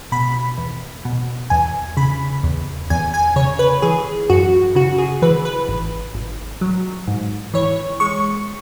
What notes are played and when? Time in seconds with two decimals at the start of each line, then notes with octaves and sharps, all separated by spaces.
0.12 B2 B5
0.58 E2
1.05 B2
1.50 E2 G#5
1.97 C#3 B5
2.43 E2
2.90 E2 G#5
3.14 G#5
3.36 C#3 C#5
3.59 B4
3.82 E3 G#4
4.30 F#2 F#4
4.75 C#3 F#4
4.98 G#4
5.22 E3 B4
5.45 B4
5.69 G#1
6.15 G#1
6.61 F#3
7.07 G#2
7.54 E3 C#5
8.00 G#3 C#6